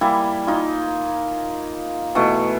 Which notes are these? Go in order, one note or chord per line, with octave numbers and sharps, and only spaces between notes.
G3 A#3 E4 G#5
D#4 F4
B2 E3 A3